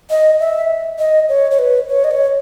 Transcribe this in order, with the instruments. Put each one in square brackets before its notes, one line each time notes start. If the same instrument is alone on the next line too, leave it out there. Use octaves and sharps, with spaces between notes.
[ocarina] D#5
E5
D#5
C#5
C#5
B4
C#5
D#5
C#5